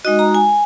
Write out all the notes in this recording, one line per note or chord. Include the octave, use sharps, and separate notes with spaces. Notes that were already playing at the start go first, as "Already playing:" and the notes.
G#3 D#4 F#4 D#5
A#5
G#5